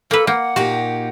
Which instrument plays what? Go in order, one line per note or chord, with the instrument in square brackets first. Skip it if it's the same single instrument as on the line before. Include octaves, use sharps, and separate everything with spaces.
[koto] A#3 B4 [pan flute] A4
[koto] A#3 [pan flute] F#5
[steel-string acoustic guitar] A#2 D#4 G4 [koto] F#4